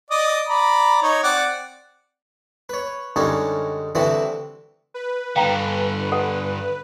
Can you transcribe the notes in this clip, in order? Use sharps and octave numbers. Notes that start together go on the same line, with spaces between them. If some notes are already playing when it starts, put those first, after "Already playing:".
D5 D#5 D#6
D5 A#5 B5
D#4 C#5
C4 D5 F#5
B4 C#5
F#2 D3 G3 G#3 C#4 D#4
C2 D3 E3 C4 F#4 E5
B4
G2 D3 F5 G5 A#5
A4 F#5